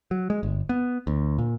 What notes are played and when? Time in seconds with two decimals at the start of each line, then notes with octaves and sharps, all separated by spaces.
0.11 F#3
0.30 G#3
0.43 G1
0.69 B3
1.07 D2
1.38 A#2